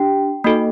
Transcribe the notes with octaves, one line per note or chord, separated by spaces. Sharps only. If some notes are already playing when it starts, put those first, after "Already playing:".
Already playing: D4 G4 G5
A#3 D#4 F#4 A4